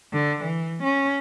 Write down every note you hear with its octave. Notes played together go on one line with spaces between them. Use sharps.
D3
E3
C#4